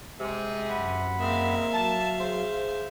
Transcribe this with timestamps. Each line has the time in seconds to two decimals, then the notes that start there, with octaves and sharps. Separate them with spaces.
0.20 C3 G#3 G#4
0.69 F#2 F#5 B5
1.20 G#3 A#3 C4 E5 F5
1.73 F#3 A5
2.21 G#4 C5